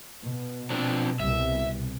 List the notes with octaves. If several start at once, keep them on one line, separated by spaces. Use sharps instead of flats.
B2
F3 C4 D4
C2 B2 E5